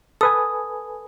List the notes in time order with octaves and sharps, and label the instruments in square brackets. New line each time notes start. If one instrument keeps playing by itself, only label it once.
[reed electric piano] A4 B4 G#5 [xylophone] D#6